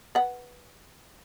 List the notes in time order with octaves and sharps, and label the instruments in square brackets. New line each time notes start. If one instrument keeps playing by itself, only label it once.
[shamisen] B4 F#5